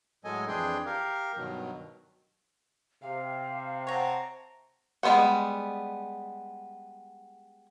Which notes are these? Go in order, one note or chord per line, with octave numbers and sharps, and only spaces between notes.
A2 F#3 G#3 A4 D#5 G#5
F2 E3 D4 G#4 G5 C6
G4 A#4 F5
G2 B2 D#3 F#3
C3 F5
C4 C#5 F#5 A5 A#5
G3 G#3 B3 C5 F#5